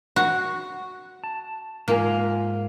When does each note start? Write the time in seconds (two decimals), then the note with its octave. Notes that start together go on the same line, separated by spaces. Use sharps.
0.16 F#4
1.24 A5
1.88 G#2 A#3 F4 G#5